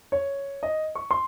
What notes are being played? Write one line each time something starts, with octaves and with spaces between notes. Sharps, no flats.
C#5
D#5
C#6
C6